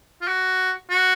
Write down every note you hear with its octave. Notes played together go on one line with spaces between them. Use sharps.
F4
F#4
F#4